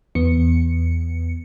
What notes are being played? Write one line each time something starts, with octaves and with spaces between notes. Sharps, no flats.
E2 B3 C#7